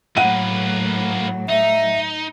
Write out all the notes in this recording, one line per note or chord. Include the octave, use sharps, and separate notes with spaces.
A2 F#3 A#3 B4 F#5 D#7
D#4 E5